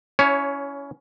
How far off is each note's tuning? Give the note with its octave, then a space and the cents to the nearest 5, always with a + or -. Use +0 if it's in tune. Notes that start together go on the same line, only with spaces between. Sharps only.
C#4 +20 E4 +0 C#5 +0